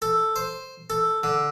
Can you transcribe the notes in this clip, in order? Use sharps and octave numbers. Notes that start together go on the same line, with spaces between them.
A4
C5
A4
D3